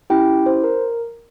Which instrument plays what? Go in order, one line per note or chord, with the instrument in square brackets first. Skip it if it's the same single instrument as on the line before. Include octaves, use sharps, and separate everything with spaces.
[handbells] C#4 E4 G4 G5
C5
A#4